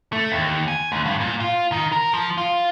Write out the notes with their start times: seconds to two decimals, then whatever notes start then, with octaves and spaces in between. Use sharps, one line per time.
0.13 A3
0.32 D#2
0.68 G#5
0.92 D2
1.06 G2
1.20 A#2
1.40 F4
1.72 D#3
1.92 A#4
2.14 F3
2.38 F4